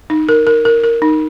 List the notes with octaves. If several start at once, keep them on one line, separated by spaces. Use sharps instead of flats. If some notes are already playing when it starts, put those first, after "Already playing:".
D#4
A#4
A#4
A#4
A#4
D#4